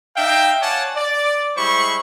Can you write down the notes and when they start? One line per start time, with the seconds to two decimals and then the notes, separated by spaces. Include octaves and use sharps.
0.16 D#4 E5 F5 G5
0.61 C#5 D5 F5 F#5 G#5 A5
0.95 D5
1.56 G3 G#3 E4 C5 B5 C#6